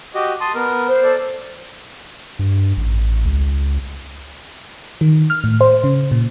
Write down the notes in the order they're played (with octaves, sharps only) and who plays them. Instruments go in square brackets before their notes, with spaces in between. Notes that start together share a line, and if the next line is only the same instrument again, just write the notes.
[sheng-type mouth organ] F#4 G4 D#5
A5 C6 D#6
B3 A#4
[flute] C5
[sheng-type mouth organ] A4 D5
[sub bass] G2
A1
C#2
[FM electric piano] D#3
F6
A2
C5
C#3
A#2